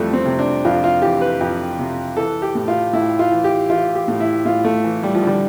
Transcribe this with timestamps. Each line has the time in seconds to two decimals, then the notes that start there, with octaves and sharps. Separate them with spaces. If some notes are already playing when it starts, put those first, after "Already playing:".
Already playing: F2 E3 G3 A3
0.13 C4
0.26 C3
0.39 D4
0.65 F2 F4
0.84 F4
1.02 E3 G4
1.21 B4
1.41 F2
1.79 C3
2.17 E3 A4
2.42 G4
2.55 A2
2.68 F4
2.93 A2 E4
3.19 F4
3.31 E3
3.44 G4
3.69 E3 F4
3.95 G4
4.08 A2
4.20 E4
4.45 A2 F4
4.65 A3
4.84 E3
5.03 G3
5.15 F3
5.22 D3 G3